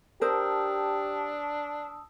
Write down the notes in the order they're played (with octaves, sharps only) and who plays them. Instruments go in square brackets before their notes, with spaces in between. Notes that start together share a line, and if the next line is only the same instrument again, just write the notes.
[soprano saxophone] D4 [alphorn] G4 [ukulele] A#4 C5 [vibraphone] A5 D#6 E6